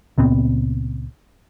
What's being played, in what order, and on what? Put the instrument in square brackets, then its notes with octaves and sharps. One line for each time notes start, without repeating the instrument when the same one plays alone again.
[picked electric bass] C#2 A#2 B3 C4